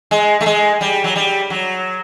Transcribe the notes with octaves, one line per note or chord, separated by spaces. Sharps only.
G#3
A3
G#3
G3
F#3
G3
F#3